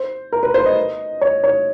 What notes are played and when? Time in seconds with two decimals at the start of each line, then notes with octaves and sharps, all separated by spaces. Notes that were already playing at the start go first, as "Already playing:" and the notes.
Already playing: C5
0.32 A#4
0.43 B4
0.54 C5
0.66 D#5
1.21 C#5
1.44 C#5